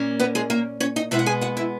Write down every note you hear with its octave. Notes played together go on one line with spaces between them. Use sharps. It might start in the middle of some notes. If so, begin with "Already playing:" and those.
Already playing: A#2 A#3 C#4
B3 B4
G#3 G#4
A#3 A#4
C#4 C#5
D#4 D#5
B2 G#3 B3 E4 E5
F#5
G#4 G#5
F#4 F#5
E4 E5